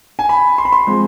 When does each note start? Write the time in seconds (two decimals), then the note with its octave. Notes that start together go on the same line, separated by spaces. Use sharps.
0.19 G#5
0.29 B5
0.58 C6
0.65 B5
0.73 C6
0.87 F3 G#3 C4